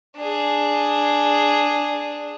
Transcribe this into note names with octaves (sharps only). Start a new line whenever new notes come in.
D4 G#4